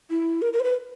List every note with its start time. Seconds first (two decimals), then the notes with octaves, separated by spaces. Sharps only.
0.10 E4
0.42 A#4
0.53 A#4
0.60 C5
0.64 B4